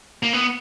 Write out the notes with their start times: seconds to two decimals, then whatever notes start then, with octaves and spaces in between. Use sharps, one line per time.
0.23 A#3
0.33 B3